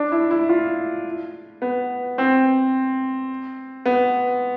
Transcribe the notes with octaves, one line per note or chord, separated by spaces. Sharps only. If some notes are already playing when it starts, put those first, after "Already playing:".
Already playing: D4
E4
E4
F4
B3
C4
B3